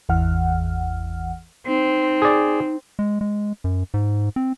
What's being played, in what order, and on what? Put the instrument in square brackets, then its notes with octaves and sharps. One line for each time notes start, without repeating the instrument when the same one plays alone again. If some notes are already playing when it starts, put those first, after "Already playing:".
[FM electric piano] G#1 E2 E3 F#5 F6
[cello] C4 [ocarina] D#4
[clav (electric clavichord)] G#4 D5
[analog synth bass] G#3
G#3
F#2
G#2
C4